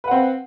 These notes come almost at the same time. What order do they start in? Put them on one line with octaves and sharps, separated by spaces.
B4 F#5 C4 F5